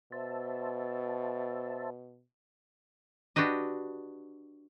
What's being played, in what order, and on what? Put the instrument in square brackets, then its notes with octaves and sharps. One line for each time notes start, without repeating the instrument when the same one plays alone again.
[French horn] B2 [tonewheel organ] C5 E5 A5
[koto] D4 F#4 G4 B4 D#5